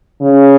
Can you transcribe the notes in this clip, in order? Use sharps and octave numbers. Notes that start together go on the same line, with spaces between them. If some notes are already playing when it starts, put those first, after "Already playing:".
C#3